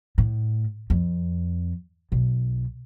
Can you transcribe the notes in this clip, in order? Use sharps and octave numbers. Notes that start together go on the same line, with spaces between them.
A2
F2
B1